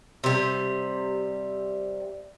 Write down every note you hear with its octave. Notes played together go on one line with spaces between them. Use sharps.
C3 G3